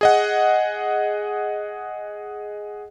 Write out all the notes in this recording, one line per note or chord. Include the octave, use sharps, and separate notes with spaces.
G#4 D#5 F#5